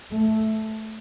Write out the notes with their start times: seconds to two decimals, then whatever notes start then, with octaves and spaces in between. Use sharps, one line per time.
0.12 A3